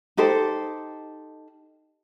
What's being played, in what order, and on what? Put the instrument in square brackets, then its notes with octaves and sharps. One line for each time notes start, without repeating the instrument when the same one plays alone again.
[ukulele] D#4 G4 A4 C5